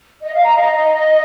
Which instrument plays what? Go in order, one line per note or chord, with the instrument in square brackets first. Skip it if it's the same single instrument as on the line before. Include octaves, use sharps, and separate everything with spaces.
[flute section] D#5
F5
A#5
D#5